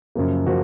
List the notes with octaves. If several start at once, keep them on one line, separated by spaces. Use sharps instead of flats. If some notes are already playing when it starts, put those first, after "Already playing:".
F#2 C#3 F3 A#3
C#3 F3 A#3 F#4